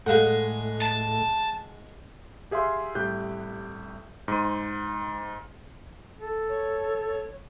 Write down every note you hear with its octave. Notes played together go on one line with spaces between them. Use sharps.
A2 G#3 A4 F5 F#5
A5
G4 G#4 E5 F5 C6
C2 A2 G4 F#6 G6
G#2 C6 D#7
A4
C#5